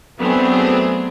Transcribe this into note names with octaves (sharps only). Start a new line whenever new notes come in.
F#3 A3 B3 C4 D4 G#4